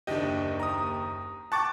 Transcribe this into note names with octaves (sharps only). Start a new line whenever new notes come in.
F#1 D#2 D4 G4 D#5
A#5 D#6
G5 A5 C#6 D6 F#6 A6